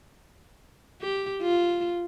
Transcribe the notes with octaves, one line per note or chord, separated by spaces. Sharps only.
G4
F4